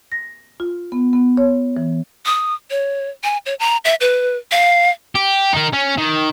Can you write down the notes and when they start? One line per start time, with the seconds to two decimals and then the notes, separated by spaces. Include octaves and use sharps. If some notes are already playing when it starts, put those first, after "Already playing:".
0.12 A#6
0.60 F4
0.92 B3
1.13 B3
1.37 C#5
1.77 E3
2.26 D#6
2.70 C#5
3.24 G#5
3.46 C#5
3.59 A#5
3.85 E5
4.00 B4
4.51 F5
5.15 G4
5.53 D#4 A#4
5.73 C#4
5.98 D#3